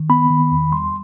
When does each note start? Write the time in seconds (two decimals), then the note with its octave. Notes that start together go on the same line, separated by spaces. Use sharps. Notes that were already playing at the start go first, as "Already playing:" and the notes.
Already playing: D#3
0.10 B3 B5
0.30 D#3
0.51 E2
0.72 G3 C6